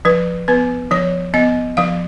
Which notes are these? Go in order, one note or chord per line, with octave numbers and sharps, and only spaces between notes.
F3 B4
B3 B4
F3 C#5
B3 D#5
F3 F5